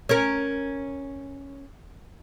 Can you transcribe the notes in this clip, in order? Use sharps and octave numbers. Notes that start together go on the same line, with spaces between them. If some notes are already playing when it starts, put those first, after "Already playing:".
C#4 A#4